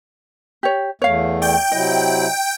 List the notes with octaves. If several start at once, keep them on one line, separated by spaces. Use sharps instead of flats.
G4 C#5
E2 A3 C#5 F5
D5 G5
C3 F#3 E4 D#5